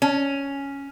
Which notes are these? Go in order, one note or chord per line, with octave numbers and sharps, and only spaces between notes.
C#4